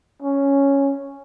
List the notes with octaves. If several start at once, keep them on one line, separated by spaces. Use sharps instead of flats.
C#4